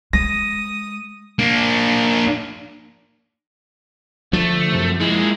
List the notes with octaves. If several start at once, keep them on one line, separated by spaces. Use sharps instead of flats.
G#3 D#6 A#6
A#3 D4
D3 F3 A3
F#2 C3
G#3 A#3 E4 G#4